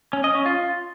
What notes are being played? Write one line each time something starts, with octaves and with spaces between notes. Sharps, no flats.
C#4
D#5
C#4
F4